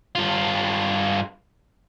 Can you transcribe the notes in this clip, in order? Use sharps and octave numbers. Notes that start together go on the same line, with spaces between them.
G2 F4